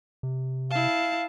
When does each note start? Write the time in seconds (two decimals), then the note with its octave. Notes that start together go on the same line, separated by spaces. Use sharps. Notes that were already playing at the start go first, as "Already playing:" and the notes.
0.23 C3
0.70 E4 F5 A5